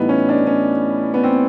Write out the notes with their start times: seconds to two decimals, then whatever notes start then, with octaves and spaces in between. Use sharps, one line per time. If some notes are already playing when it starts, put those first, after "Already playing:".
Already playing: A2 E3 G3 B3 D#4
0.09 C#4
0.29 D4
0.47 C#4
1.14 B3
1.24 C4